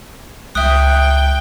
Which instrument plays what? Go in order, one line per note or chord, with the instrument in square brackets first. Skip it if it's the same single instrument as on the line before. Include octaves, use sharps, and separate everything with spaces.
[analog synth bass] C#2 [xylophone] E5 D#6 [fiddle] G5 [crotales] F#6